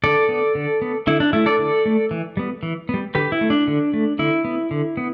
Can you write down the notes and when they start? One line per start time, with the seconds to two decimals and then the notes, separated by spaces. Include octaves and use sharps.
0.04 D3 A4 D5
0.29 B3
0.55 D3
0.82 B3
1.07 D3 E4
1.20 D4
1.33 A3 E4
1.46 A4 D5
1.59 D3
1.86 A3
2.11 E3
2.37 G3 B3
2.63 E3
2.89 G3 B3
3.15 D3 G4 B4
3.32 E4
3.41 A3
3.50 D4
3.68 D3
3.93 A3
4.19 D3 E4
4.45 B3
4.71 D3
4.97 B3